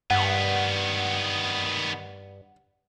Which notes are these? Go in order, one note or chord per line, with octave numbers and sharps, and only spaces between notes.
G2 D#3 B3 F#5